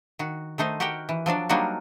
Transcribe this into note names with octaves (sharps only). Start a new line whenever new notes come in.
D#3 F#4
D#3 A3 D#4 C5
F#4 G4 A#4 F#5 G5
E3
F3 F#3 D4 D5
F#3 G3 A#3 D4 D#4 F#4